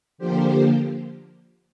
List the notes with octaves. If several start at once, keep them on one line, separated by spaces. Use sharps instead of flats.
D3 F3 A#3 G4 C5